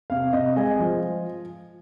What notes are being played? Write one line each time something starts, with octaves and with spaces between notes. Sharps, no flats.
C3 F5
C3 D#5
G#3 D#5 G#5
F3